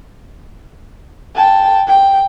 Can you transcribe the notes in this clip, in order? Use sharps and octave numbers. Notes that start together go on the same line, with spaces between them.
G5 A5
G5